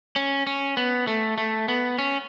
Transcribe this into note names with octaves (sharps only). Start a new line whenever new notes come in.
C#4
C#4
B3
A3
A3
B3
C#4